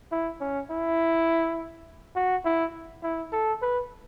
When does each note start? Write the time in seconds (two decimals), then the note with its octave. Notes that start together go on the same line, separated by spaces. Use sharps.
0.11 E4
0.41 C#4
0.70 E4
2.16 F#4
2.45 E4
3.03 E4
3.32 A4
3.62 B4